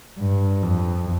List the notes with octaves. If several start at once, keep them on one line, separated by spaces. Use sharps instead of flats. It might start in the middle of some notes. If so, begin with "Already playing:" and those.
G2
F2